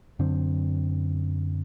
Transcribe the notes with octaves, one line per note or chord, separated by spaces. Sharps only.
F#2 D3 C4